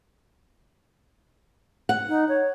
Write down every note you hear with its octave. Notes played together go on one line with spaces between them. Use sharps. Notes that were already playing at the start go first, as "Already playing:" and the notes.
F#5
D#4
C#5